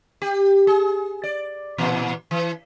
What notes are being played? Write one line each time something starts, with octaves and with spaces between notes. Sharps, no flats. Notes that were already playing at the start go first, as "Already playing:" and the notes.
G4
G#4
D5
A#2 E3
E3